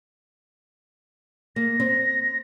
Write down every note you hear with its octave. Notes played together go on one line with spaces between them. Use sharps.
A#3 A#6
C4